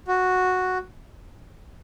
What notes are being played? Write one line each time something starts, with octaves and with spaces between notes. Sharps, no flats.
F#4